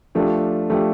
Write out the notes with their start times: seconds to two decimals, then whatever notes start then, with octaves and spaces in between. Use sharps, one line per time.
0.15 F3 A3 D4 G4
0.70 F3 A3 D4 G4